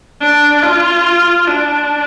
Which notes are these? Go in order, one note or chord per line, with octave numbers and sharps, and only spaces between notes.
D4
F4
D4